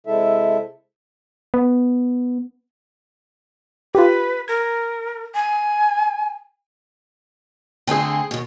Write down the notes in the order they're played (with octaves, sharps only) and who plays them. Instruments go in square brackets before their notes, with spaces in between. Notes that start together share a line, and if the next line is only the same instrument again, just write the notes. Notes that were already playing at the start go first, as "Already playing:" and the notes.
[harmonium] C3 G#3 E4 A4 E5
[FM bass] B3
[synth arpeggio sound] F4 G4 [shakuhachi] B4
[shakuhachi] A#4 [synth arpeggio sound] G#6
[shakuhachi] G#5
[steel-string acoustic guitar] D3 A3 C4 [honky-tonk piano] G#4 G5
[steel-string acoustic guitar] D#2 B2